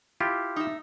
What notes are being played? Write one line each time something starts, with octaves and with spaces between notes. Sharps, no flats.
E4 F4 G4
D#4 E5